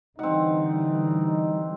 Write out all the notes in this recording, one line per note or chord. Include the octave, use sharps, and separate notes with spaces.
D3 E3 G3 C4 D#4 F#5